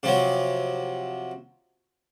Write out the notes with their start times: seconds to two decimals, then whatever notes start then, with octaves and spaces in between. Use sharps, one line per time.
0.03 C3 F3 F#3